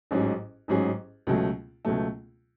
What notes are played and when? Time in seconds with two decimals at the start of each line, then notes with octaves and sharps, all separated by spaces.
0.11 A1 G#2 F#3 C#4 G#4
0.68 A1 G#2 F#3 C#4 G#4
1.27 C#2 B2 F#3 A3
1.85 C#2 B2 F#3 A3